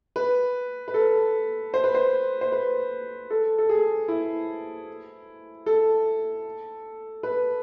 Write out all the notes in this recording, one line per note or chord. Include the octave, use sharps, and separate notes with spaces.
B4
B4
A4
C5
B4
C5
C5
B4
A4
A4
G#4
E4
A4
B4